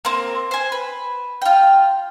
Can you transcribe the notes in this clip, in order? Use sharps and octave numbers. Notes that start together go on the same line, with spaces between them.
A#3 C4
C5 G#5
B4
F4 G5